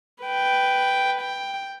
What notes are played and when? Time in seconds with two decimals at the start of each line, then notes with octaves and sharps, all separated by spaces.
0.23 B4 G5
1.21 G5